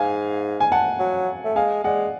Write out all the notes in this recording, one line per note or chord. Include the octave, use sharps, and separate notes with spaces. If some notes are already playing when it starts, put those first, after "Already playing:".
Already playing: G#2 F5 G#5
G#5
F#5 A5
F#3
A3
G#3 F5 G#5
G#3 D5 F#5